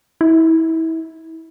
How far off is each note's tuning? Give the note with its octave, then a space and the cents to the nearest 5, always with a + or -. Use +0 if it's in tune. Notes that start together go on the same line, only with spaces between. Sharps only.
E4 -30